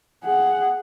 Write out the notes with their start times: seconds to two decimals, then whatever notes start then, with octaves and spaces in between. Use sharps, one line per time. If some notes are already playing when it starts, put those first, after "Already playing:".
0.24 G#4 F#5